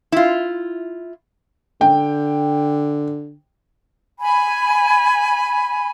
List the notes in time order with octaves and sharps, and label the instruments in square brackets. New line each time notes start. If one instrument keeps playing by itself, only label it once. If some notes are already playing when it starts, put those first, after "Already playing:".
[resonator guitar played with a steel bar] E4 F4
[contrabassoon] D3 [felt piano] G5
[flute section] G#5 B5